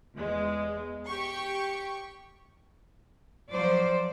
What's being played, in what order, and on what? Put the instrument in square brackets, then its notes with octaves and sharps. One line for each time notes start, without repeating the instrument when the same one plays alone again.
[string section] E2 G#3
G4 C#6
[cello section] F3 F#3 C5 D5